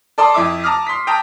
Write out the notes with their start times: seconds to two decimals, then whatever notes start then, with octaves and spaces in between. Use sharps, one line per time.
0.18 A4 D5 A5 C6 D#6
0.34 F2 E4 E5 D6
0.64 A5 A#5 D6 D#6 F6
0.87 C6 B6
1.07 G5 A5 A#5 D#6